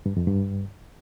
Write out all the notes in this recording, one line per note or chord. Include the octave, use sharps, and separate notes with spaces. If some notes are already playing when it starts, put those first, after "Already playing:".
G2
F2
G2